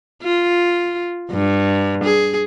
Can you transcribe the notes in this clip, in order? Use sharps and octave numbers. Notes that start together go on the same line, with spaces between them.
F4
G2
G#4